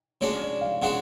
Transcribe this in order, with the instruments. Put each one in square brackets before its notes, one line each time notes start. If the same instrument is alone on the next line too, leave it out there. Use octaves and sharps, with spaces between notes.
[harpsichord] C#3 G#3 D4 F#4 [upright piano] C#5
[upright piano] D5
F5
[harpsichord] C#3 G#3 D4 F#4 [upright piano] F#5